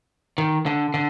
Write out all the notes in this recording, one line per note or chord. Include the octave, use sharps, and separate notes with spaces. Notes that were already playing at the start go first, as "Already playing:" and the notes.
D#3
D3
D3